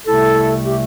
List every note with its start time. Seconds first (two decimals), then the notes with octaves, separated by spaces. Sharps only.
0.07 C2 C3 A3 E4 A4
0.66 G4